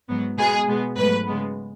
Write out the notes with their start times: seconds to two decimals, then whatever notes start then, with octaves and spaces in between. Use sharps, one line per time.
0.09 G#2 F#3 B3
0.38 B2 G#3 B3 G#4
0.68 B2 G#3 B3
0.97 G#2 F#3 A3 B4
1.26 C#3 G#3 B3